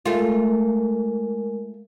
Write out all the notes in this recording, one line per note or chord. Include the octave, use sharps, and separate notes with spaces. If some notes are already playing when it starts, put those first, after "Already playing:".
G#3 A3 F4 A#4